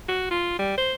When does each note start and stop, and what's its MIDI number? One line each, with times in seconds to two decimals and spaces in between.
0.08 0.27 66
0.30 0.54 65
0.58 0.73 55
0.77 0.94 72